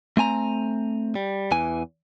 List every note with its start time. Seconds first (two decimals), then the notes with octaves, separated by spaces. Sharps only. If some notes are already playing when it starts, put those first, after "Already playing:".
0.17 A3 C4 G#5 A#5
1.15 G3
1.51 E2 E3 G#5